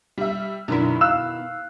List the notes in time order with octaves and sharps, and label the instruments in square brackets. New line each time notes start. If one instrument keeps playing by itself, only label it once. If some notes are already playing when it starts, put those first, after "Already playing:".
[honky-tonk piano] G3 E5
[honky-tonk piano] F#2 D3 [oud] B2 D#3 E4
[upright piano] F5 E6 F#6 [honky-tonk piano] E7